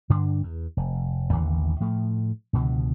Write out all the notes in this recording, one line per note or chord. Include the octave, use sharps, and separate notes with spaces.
G2 D3 D4
E2
F1
A1 D#2 D3 E3
A2 F3 A3
C#2 B2 D3 F3